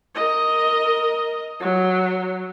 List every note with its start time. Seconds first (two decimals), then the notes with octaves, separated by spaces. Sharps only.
0.15 A#4 D#5
1.60 F#3